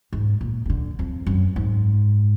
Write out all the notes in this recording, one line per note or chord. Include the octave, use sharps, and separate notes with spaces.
G#2
A#2
B2
D3
F2
F#2
G#2